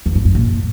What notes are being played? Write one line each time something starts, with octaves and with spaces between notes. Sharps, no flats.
E2
G2
F#2
A#2